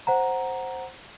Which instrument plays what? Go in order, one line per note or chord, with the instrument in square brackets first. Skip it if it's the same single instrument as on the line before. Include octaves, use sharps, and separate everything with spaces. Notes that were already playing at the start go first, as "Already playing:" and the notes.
[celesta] C5 F#5 A#5